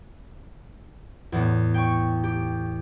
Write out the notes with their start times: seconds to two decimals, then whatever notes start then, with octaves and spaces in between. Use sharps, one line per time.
1.32 E2 A2
1.74 G5 C#6
2.24 G4